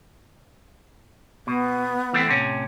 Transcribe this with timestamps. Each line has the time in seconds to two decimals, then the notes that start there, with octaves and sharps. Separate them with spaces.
1.47 B2 B3
2.13 E3 A3 C4
2.27 A2 C3 C#4